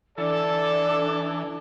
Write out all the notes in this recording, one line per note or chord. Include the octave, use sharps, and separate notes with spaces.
E3 D4 A4 D5